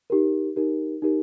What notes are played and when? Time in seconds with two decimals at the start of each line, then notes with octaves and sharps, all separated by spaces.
0.10 D#4 G4 A#4
0.56 D#4 G4 A#4
1.02 D#4 G4 A#4